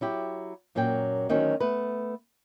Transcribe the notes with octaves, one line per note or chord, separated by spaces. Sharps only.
F#3 E4 G4
F#2 A#2 F#3 C#4 G5
D2 D#3 F#3 C4 C#4
A3 B3 B4